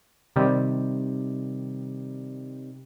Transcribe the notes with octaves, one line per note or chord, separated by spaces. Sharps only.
C3 D#3 G3